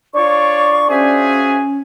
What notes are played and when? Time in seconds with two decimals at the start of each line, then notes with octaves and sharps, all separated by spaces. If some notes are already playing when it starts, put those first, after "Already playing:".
0.15 D4 F4 C#5 D5 C#6
0.89 C#4 F4 F#4 G#4 C5 E5 G#5